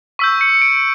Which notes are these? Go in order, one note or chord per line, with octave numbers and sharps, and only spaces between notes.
C#6 E6 G6 B6
C#7
D7